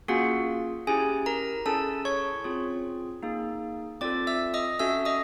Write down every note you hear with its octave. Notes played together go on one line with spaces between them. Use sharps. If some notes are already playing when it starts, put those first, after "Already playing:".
A#3 C#4 F4 F#4 G#4 F#5
C#4 E4 G4 G#4 G#5
A#4 A#5
C#4 E4 G#4 A4 A5
C#5 C#6
C4 F4 G#4
A#3 D#4 G#4
C4 F4 A4 D5 D6
E5 E6
D#5 D#6
C#4 F#4 A4 E5 E6
D#5 D#6